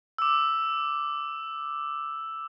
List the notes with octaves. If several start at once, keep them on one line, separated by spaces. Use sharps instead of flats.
D6 E6